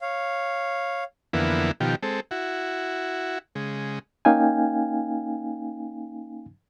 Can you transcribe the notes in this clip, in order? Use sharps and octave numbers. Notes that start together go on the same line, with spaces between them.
C#5 F5
F2 D3 E3 A#3 B3 E4
B2 D#3 F3 G4
G#3 C4 A4
E4 F#4
C#3 G#3
A#3 C#4 D#4 F5 G5 G#5